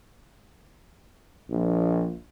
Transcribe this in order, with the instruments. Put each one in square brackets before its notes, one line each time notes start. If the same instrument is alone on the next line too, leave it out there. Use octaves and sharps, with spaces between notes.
[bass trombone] A#1